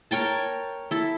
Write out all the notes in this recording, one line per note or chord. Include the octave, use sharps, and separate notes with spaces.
A#4 C#5 G5 A5
E4 A4